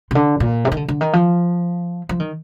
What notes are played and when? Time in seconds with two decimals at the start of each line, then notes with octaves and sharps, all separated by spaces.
0.11 C3
0.15 D3
0.40 A#2
0.65 C3
0.72 D#3
0.77 D3
0.88 D3
1.01 D#3
1.13 F3
2.09 F3
2.20 D#3